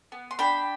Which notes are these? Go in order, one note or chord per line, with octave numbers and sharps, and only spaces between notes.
B3
C6
D4 G5 B5